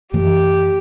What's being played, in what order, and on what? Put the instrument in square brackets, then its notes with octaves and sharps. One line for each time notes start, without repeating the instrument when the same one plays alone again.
[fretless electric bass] F#2 E3 A3 [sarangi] G4